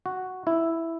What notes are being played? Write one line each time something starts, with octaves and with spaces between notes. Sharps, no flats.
F#4
E4